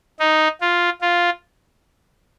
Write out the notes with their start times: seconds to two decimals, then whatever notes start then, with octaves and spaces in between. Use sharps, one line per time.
0.20 D#4
0.61 F4
1.01 F4